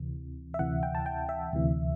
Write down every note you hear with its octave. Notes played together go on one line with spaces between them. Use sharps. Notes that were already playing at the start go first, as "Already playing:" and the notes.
Already playing: D2 C3 E3
E5
D2 C3 E3 F#5
G5
A5
G5
E5
D2 C3 E3